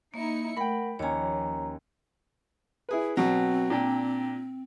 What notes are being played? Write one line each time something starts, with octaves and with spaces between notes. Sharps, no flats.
A#3 D#4 E4 C#7
A3 A#4 F#5 G5 B5
D#2 F3 C#4 C#5 A#5
E4 G#4 B4
B2 F#3 C4
A#2 D4 G5